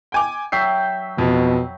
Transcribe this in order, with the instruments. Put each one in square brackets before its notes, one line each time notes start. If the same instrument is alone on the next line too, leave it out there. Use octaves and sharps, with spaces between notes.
[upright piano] G5 G#5 D6
[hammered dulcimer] F#3 E5 G5 [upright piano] C7
[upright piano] F2 [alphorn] B2